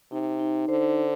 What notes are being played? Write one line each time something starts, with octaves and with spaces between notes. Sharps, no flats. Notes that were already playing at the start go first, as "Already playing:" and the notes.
C3 D#4
D#4
D3 C5
C5